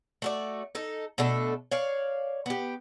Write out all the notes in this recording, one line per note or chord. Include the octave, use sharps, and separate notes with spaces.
A3 F#4 D5
D#4 A4
B2 A3 D4 A4
C#5 D5 F5
B3 G4